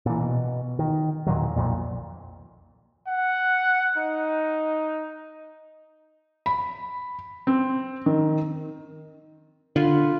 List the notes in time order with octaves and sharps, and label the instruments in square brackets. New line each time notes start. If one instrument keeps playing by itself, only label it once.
[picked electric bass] A#2 E3
B2
D#3
E2 A#2 D#3 F#3
B1 F2 A#2
[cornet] F#5
D#4
[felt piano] B5
C4
D#3
[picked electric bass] D3 [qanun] F4 B4